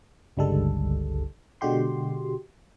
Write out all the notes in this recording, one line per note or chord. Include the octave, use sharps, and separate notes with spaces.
G1 C#2 D3 G3 G#3 A4
B2 D3 G#3 F#4 G4 C6